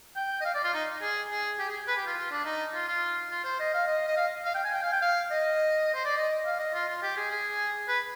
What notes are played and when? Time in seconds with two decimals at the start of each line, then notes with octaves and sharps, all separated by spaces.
0.16 G5
0.41 D#5
0.45 F5
0.54 D5
0.64 F4
0.74 D#4
1.02 G#4
1.31 G#4
1.59 G4
1.69 G#4
1.88 B4
1.97 G4
2.06 F4
2.17 F4
2.31 D4
2.45 D#4
2.74 F4
2.88 F4
3.31 F4
3.45 C5
3.60 D#5
3.74 F5
3.87 D#5
4.08 D#5
4.17 F5
4.45 F5
4.54 G5
4.64 G#5
4.74 G5
4.83 F5
4.92 G5
5.02 F5
5.31 D#5
5.94 C5
6.05 D5
6.17 D#5
6.46 F5
6.60 D#5
6.74 F4
6.88 F4
7.03 G4
7.17 G#4
7.31 G#4
7.88 B4